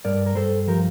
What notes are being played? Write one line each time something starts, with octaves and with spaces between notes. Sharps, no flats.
G2 A#4 D5
A#4
G2 A4 C5
F3 G4 A#4